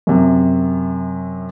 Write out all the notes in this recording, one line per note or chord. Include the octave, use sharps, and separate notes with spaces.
F#2 C3